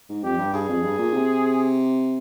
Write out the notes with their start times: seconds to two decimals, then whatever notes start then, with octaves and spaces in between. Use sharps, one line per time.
0.09 G#2
0.24 F2 G4
0.39 G2
0.54 G2 G#4
0.69 F2
0.83 G2
0.98 A#2
1.13 C3